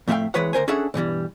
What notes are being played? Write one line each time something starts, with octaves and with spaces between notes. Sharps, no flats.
F2 A2 A3 E5 F5 G5
C2 E3 G#3 B4 C#5 F#5
D2 A#4 C5 G#5
C#4 D4 G#4 A4 E5 F#5
G2 B2 E3 G3